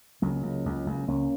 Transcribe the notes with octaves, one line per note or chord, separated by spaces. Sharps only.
C#2 F#3 A#3
C#2
C#2
C#2
C#2 A#3 C#4